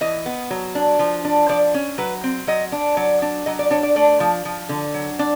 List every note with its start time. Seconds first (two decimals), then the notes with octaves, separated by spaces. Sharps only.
0.01 E3 D#5
0.26 B3
0.51 F#3
0.75 D4
0.99 F3
1.25 D4
1.49 F3 D5
1.74 C#4
1.98 F#3 B4
2.24 C4
2.47 F#3 D#5
2.72 D4
2.97 F#3 D5
3.22 D4
3.46 F#3 D#5
3.59 D5
3.71 D4 C#5
3.83 D5
3.96 A3 D5
4.20 F3
4.45 F3
4.69 D3
4.94 F#3
5.19 D4